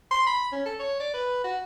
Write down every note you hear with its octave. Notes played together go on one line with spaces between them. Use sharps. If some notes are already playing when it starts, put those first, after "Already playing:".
C6
B5
C#4
A4
C#5
D5
B4
F#4